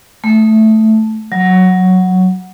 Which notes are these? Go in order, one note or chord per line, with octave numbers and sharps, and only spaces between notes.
A3
F#3